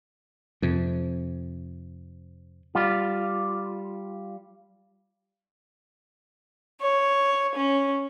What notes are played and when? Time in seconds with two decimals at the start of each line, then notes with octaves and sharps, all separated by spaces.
0.62 F2 C3
2.75 G3 F4
6.80 C#5
7.54 C#4